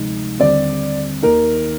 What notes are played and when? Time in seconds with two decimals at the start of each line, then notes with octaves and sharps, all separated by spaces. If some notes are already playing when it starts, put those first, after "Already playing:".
Already playing: D2 C3 F3 G#3 D#4
0.40 D#2 D3 G3 C4 D5
1.23 D#2 D#3 A#3 D#4 A#4